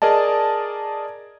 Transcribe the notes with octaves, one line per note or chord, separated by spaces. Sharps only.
G#4 A#4 D5 D#5 A5